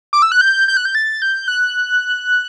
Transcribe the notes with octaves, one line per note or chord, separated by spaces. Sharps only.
D6
E6
F#6
G6
G6
F#6
G6
A6
G6
F#6